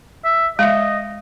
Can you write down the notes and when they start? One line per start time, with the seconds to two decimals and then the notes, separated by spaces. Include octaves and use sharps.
0.25 E5
0.59 G#3 D#5 E5